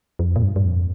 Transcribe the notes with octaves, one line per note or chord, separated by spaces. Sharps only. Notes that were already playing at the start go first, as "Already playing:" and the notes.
F2
A#2
G2
G2
F2